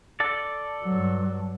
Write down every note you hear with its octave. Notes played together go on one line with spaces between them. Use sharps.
A4 D5
G2 F#3